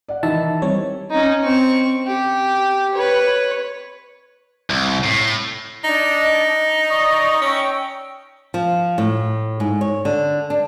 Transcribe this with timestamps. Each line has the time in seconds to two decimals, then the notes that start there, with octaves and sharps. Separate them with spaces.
0.09 D5 F#5
0.23 D#3 E3 D#4 E5 A5
0.62 G3 C4 C#5
1.11 C#4 D#4
1.44 C4 C#6
2.07 G4
2.95 B4 C#5
4.70 C2
5.04 A2
5.84 D4 D#4 D#5
6.89 D5 C#6 D#6
7.42 C#4 G5 C#6 E6
8.54 F3
8.98 A2
9.60 G#2
9.81 C#5
10.05 D3
10.50 D4